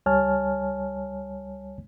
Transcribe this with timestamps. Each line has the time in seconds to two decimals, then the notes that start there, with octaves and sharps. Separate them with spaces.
0.06 C#2 G3 C#5 G#5 A5 F6